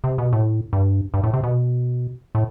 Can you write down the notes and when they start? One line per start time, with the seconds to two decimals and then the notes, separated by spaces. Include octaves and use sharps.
0.04 C3
0.18 B2
0.33 A2
0.73 G2
1.14 G2
1.23 A2
1.33 C3
1.43 B2
2.35 A2